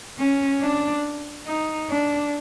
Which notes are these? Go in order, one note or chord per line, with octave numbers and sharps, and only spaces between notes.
C#4
D4
D#4
D4